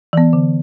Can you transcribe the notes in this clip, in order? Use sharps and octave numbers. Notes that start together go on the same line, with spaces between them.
E3 B3
D3